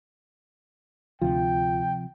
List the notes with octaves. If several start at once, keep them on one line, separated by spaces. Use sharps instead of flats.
D2 C3 F3 F4 G5